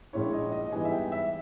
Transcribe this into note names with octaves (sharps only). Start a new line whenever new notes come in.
A#1 A#2 G#3 C#4 E4 C#5
D#5
D#5
G#2 E3 G3 B3 D#4 G#5
E5
G5
E5